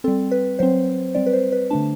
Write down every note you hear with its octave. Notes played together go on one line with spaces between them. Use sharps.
G3 C4 A4
B4
F#3 C4 C5
G3 C4 D5
B4
C5
B4
D3 A3 D4 A5